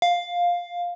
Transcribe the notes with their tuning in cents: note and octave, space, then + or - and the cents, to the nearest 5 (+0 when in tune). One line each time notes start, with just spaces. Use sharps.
F5 +5